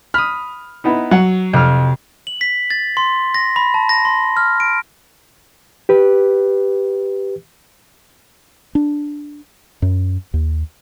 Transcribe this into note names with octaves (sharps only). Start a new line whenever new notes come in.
B5 D#6 F6
B3 D#4 E4
F#3 F#5
F2 C3 F6
F#7
B6
A6
C6
A#6
B5
A5
A#6
C6
F6
D7
G4 B4
D4
F#2
D#2